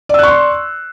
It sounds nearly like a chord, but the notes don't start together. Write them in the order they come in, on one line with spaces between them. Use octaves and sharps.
D5 E6 F#6 C#6 C6